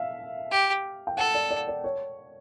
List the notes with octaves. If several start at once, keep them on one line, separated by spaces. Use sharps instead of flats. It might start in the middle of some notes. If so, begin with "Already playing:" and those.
Already playing: E5 F5
G4
G5
A4 F#5
D5
D5
D5
C#5